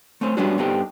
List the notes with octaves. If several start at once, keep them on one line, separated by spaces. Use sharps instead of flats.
A3 C4 C#4 C5
G3 G#3 B3 C#4 D4 F#4
G2 B3 C4 D#4 G4 A4